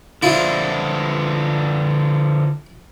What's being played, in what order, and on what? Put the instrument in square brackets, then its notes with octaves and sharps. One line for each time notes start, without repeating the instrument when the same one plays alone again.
[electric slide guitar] D3 F3 D4 [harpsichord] E4 F4